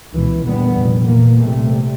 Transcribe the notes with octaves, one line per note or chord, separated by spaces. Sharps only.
C#2 B2 E3
E2 A#2 D3 G3 B3
F1 A#2
A#2 E3 A#3
C2 C3 G3 A3